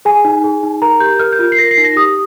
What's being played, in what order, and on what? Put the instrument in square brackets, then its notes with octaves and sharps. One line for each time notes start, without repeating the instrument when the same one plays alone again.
[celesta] G#4 G#5
D#4
G#4
D#4
A#4 A#5
G4 G6
A#4 F6
G6
F4
C7
A#4 A#6
C7
D#4
A#6
G4 D#6